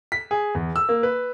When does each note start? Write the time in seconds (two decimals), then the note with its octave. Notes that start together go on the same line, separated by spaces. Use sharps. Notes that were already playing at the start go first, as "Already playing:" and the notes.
0.12 B6
0.31 G#4
0.55 E2
0.76 E6
0.89 A#3
1.03 B4